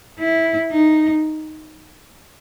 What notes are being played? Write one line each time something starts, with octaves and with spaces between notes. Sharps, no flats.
E4
D#4